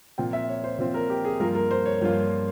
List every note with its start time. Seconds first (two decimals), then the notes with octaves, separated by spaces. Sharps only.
0.18 A#2 F3 C4 F4 G5
0.33 E5
0.49 C#5
0.64 C5
0.79 A#2 F3 C4 F4 C5
0.94 A#4
1.10 G4
1.25 G#4
1.40 G2 F3 A#3 F4 A#4
1.55 A#4
1.71 C5
1.86 C#5
2.01 G2 F3 A#3 F4